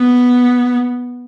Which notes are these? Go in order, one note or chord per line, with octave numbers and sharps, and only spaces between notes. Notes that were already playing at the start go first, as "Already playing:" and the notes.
Already playing: B3